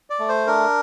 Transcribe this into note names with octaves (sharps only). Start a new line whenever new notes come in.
D5
A3
C5
D4 A#4